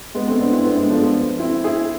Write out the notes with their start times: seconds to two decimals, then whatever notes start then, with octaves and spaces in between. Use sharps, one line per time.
0.15 G#3 B3
0.27 A3 C4
0.40 B3 D4
0.52 C4 E4
0.65 B3 D4
0.77 G#3 B3
0.89 F3 A3
1.02 G#3 B3
1.39 C4 E4
1.64 E4 G#4